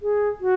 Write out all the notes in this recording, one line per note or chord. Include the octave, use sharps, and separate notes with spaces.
G#4
F#4